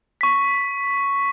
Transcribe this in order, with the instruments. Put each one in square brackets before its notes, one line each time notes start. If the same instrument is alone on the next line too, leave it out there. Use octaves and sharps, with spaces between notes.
[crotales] C#6 B6